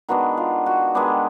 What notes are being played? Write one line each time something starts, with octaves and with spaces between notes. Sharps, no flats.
D#3 G#3 B3 D4 F#4
F4
F#4
D#3 G#3 B3 D4 G4